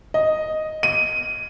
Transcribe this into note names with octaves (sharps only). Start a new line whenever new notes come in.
D#5
D#7